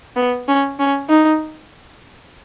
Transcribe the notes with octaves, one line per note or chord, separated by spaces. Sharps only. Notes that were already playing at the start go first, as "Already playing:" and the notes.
B3
C#4
C#4
D#4